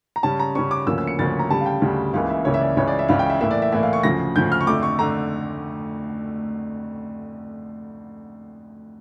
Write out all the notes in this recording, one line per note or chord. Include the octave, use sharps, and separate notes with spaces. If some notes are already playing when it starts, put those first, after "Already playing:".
A#5
C#3 G3 C#4 A5
A#5
C#3 G3 C#4 C#6
D6
D2 C#3 F3 A#3 C#4 E6
E6
C#7
D2 C#3 F3 A#3 C#4 A6
A#5
D2 C#3 G3 A5
F5
G5
D2 C#3 G3
C#2 C#3 E3 A#3 F5
E5
C#2 C#3 E3 A#3 C#5
E5
D5
C#2 C#3 E3 C#5
D5
E5
C#2 C#3 E3 F5
G5
E5
A2 E3 A#3 E4 E5
D5
E5
A2 E3 A#3 E4 E5
F5
C#6
D2 C#3 F3 A#6
D2 C#3 F3 G6
F6
C#6
F2 D3 A3 D6
C#6
D3 A3 A#5